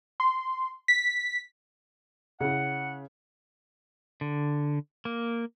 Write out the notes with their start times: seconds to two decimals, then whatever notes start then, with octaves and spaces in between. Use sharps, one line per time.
0.20 C6
0.88 B6
2.41 C#3 E4 F#5
4.21 D3
5.05 A#3